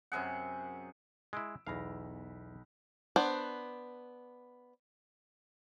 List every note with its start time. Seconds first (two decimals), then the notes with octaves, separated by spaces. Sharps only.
0.12 F#2 C3 G#4 F#5
1.33 G#3 E4 E6 D7
1.67 B1 E2 F5 B5 A#6
3.16 B3 D4 C5